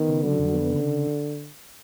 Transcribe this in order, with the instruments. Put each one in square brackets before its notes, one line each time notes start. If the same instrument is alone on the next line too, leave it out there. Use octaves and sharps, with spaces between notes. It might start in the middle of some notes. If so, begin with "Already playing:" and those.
Already playing: [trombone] D#3 [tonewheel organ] B3
[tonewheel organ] C#3
[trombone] D3 [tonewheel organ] F#3
[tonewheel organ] F2
B3
C#3